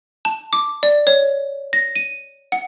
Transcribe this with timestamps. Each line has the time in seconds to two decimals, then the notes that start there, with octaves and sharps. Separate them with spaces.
0.25 A5
0.53 D6
0.83 D5
1.07 C#5
1.73 A#6
1.96 D#7
2.52 F#5